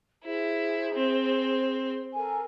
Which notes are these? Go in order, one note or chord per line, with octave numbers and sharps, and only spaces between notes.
E4 G#4 C5
C4
A4 A#4 G#5